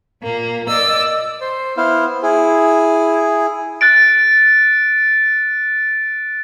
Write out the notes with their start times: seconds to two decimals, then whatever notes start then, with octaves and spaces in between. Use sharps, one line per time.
0.23 A#2 A#3
0.68 D5 D#5 E6
1.41 C5
1.77 B3 E4 C5 F5
2.23 E4 G#4
3.81 F#6 A6 D7